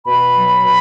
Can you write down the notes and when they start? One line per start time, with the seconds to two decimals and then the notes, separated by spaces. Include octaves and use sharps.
0.04 B2 B5
0.33 F#3
0.62 B2